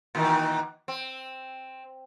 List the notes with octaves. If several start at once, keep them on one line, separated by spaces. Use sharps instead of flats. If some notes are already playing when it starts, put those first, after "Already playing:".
A#2 D#3 E3
C4